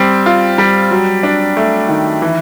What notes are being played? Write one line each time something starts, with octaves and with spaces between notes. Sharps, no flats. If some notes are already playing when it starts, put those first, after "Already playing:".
Already playing: G3 C4
F4
G3
F#3
D4
A3
D#3
E3